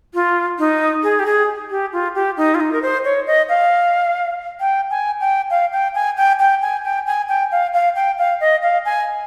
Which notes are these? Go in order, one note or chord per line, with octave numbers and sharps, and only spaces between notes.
F4
D#4
G#4
G4
G#4
G4
F4
G4
D#4
F4
D#4
A#4
C5
C#5
D#5
F5
G5
G#5
G5
F5
G5
G#5
G5
G5
G#5
G5
G#5
G5
F5
F5
G5
F5
D#5
F5
G#5